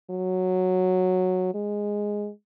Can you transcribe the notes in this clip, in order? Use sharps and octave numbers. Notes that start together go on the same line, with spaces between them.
F#3
G#3